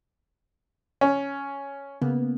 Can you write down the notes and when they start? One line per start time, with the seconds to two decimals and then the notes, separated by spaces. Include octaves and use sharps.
1.01 C#4
2.02 C#3 A#3 B3